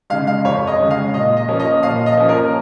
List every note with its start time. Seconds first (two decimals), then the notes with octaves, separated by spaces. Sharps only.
0.10 C#3 G#3 F5
0.27 F5
0.44 F2 C#5
0.67 D#5
0.79 C#3 G#3
0.91 F5
1.14 A#2 D#5
1.37 D#5
1.48 F3 A#3 C#4
1.60 D#5
1.83 A#2 F5
2.06 D#5
2.17 F3 A#3 C#4
2.29 A#4